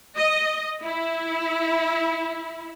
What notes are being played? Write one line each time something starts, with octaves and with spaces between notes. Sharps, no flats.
D#5
E4